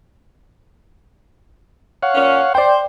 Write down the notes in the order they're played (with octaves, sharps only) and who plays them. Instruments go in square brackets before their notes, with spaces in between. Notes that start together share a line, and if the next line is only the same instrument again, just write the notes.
[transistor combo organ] C#5 F5 F#5
[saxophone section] A#2 C#4
[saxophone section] C5 [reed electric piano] D5 G5